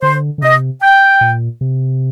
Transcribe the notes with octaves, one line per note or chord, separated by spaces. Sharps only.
D3 C5
D3
C3 D#5
G5
A#2
C3